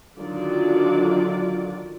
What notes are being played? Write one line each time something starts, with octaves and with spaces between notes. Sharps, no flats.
D3 D#3 F#3 F4 D5